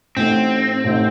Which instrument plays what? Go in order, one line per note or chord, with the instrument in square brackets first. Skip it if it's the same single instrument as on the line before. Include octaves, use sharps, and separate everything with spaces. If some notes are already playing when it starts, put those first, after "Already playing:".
[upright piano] A1 A2 A3 D#4 [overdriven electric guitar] C4
[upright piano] A1 A2 A3 D#4